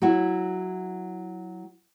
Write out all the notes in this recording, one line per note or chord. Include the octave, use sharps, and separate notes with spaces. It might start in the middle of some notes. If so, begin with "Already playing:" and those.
F#3 E4 F#4